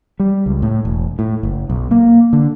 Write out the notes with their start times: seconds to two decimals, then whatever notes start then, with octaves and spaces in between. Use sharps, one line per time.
0.20 G3
0.46 C#2
0.62 A2
0.85 E1
1.19 A2
1.43 F#1
1.70 B1
1.91 A#3
2.33 D3